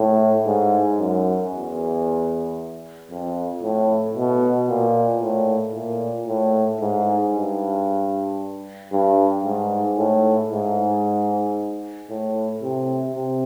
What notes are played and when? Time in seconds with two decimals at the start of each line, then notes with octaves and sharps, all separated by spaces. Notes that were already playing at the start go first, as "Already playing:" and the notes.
Already playing: A2
0.47 G#2
0.99 F#2
1.53 E2
3.11 F2
3.63 A2
4.17 B2
4.70 A#2
5.22 A2
5.75 A#2
6.28 A2
6.81 G#2
7.34 G2
8.92 G2
9.46 G#2
9.98 A2
10.51 G#2
12.10 A2
12.63 C3
13.15 C3